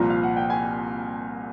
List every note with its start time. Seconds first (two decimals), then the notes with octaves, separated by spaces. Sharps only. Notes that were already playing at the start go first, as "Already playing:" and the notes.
Already playing: C2 A#2 F3 A#5
0.10 F5
0.23 F#5
0.37 G5
0.50 G#5